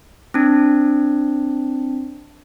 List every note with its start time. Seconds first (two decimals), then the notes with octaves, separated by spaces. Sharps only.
0.34 C4 D4